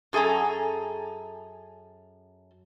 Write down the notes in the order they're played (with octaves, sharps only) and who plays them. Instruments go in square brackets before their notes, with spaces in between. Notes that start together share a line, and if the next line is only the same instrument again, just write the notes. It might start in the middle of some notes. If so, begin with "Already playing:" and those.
[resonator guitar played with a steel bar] F#2 G#4 A4 G#5 A#5